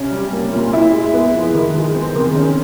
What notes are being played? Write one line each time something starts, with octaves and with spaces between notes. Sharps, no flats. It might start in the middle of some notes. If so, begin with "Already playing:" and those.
Already playing: C3 C#4
G3
A#3
A#2
E4
G#3
B3
F3
D#3
G#3
C4
D#3
C#4